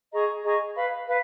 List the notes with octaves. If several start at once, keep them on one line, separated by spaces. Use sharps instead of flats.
G#4 D#5 A#5 C#6
G#4 D#5 A#5 C#6
B4 F5 B5
B4 F5